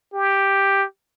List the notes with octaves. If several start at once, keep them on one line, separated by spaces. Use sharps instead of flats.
G4